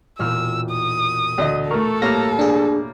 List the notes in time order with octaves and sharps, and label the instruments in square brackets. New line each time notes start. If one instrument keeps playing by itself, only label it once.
[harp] E1 A#2 F6 [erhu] E6
[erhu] D#6
[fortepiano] D2 D#5
[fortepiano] A3 A#4 [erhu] A4 [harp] C#6
[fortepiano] A2 G3 A#3 [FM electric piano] F6 A#6
[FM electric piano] D4 G#4